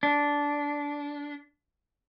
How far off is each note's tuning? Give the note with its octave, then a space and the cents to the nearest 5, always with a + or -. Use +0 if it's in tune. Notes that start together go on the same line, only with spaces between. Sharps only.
D4 -15